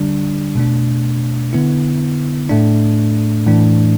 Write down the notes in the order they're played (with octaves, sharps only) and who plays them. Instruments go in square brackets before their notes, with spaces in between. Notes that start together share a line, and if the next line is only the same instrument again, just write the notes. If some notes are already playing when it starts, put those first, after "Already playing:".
Already playing: [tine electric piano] D3 G3 D4
B2 A3 D4
D3 B3 E4
A2 A3 D4
A2 E3 A3 D4